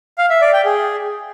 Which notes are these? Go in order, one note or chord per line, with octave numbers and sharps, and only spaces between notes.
F5
E5
D5
G5
G#4